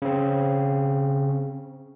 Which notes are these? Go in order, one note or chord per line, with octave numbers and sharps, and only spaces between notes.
C#3 C4